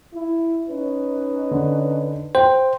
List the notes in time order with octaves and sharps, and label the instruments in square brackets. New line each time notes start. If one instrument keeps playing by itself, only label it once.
[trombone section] E4
C#4 D#4 B4
[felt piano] D3
[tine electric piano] C5 [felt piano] G5